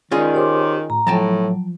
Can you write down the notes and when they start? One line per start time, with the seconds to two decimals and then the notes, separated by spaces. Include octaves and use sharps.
0.11 D#3 C#4 F4 G#4 D5
0.34 G4 A#4 C5 C#5 C6 D6
0.90 A2 A#5
1.07 A2 F3 F#3 G5 A5 A#5